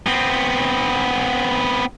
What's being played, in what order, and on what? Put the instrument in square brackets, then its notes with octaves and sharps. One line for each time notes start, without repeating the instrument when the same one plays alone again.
[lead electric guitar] B3 C4